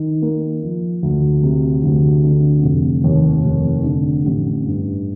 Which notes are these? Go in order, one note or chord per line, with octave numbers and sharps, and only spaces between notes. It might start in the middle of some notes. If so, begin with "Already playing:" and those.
Already playing: D#3
A#3
F3
D2
C3
D2
D3
F1
D#2
F1
D3
A1
G2